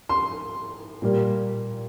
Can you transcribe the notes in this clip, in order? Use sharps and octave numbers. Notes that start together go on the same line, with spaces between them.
C6
A#2 G3 A#3